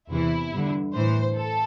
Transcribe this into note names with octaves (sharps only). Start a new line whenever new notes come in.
E2 C3 E3 E4
G2 D3
A2 E3 C5
A4